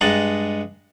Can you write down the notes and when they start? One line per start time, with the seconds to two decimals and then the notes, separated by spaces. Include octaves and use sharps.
0.01 G2 G#3 D#5 F#5 A5 A#5